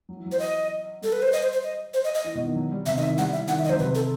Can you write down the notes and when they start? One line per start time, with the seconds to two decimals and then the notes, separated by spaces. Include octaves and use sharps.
0.09 F#3
0.17 E3
0.26 F#3
0.32 C5
0.39 D#5
1.02 G3 A4
1.12 B4
1.22 C5
1.33 D#5
1.42 C5
1.53 C5
1.63 D#5
1.94 C5
2.04 D#5
2.15 D#5
2.24 E3
2.35 B2
2.45 D#3
2.55 F#3
2.72 G3
2.86 C3 E5
2.96 D#3 D#5
3.03 E5
3.07 E3
3.18 G3 F#5
3.28 G3
3.32 E5
3.38 E3
3.48 D#3 F#5
3.59 E3 E5
3.64 D#5
3.69 F#3 C5
3.74 D#3
3.79 C3 B4
3.95 A4